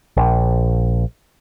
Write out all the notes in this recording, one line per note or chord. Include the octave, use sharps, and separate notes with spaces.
A#1